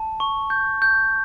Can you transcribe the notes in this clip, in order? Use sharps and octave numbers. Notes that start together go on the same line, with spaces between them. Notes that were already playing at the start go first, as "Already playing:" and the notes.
Already playing: A5
C#6
G6
G6